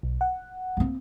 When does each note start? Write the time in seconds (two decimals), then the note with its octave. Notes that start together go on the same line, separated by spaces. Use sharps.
0.03 B1
0.21 F#5
0.77 A#3 C4